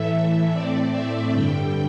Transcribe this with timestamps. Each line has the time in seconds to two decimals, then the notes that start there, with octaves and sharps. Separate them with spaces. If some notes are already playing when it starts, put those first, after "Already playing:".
Already playing: A2 E3 A3 E5
0.53 A2 A3 C4 D5
0.92 E5
1.32 G2 D3 G3 G5